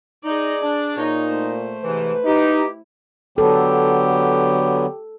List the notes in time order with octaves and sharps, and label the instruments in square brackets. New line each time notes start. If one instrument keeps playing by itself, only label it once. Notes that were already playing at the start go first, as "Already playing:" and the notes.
[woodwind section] D#4 [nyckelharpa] G#4 D5
[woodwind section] D4
[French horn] A#2 [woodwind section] D#4 [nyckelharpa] C#5
[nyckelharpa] A3 C5
[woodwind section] G#2 C3 E3 [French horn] B4
[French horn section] D#4 [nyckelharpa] E4 [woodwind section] G4
[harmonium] D3 F#3 B3 [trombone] G4 [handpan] A4